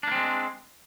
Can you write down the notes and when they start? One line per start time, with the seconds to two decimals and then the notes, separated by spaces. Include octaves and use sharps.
0.03 D4
0.07 A#3
0.11 C4
0.15 G#3